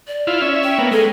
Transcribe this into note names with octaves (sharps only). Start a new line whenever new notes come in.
D5
E4 F4
C#4 E5
G5
A#3 B3
G#3 A4